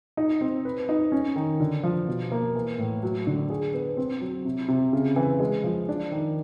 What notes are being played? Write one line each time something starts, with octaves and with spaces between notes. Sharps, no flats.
D#4
C4
B4
D#4
C#4
D#3
D3
F3
B2
A#3
E3
A2
F#3
D3
G#4
B3
C4
F#3
C3
C3
C#3
E3
G#3
F3
D4
D#3